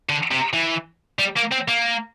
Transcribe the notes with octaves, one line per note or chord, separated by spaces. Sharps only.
D3
C3
E3
G3
A#3
C4
A#3